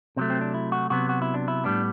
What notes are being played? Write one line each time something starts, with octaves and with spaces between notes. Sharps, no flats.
C3 F#3 A3 C4
C4
D4
E4
F#4
C3 F#3 B3 F#4
F#4
E4
D4
E4
A2 G3 B3 D4